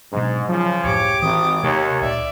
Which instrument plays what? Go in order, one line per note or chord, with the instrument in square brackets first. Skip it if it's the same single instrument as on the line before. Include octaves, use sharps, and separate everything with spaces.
[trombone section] G#2 [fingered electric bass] B2 F#3 D4
[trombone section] C#3 F3 [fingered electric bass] F#3
[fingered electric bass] C#2 F#2 A2 [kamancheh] G4 D6 [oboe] C#5
[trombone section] G#1 [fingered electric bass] E3 C4 [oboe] D#6
[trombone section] D#2 [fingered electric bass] C3 A3 [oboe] C#5
[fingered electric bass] C#2 A#2 [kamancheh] D5 E5